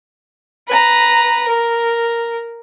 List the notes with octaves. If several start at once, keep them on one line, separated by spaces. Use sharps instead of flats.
B4 A#5
A#4